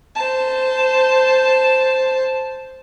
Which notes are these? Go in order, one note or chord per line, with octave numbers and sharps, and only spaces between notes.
C5 A5